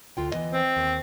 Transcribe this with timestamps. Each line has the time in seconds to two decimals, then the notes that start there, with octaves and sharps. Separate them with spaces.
0.17 D2 F4 G5
0.32 E3 B3 D#5
0.53 C4
0.77 D#2